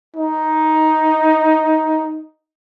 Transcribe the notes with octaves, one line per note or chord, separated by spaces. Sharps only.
D#4